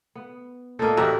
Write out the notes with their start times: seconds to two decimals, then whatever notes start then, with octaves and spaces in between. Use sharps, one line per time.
0.15 B3
0.79 A#2 A#3 A4 D#5
0.97 A1 D4 F#4 G4 A#5 E6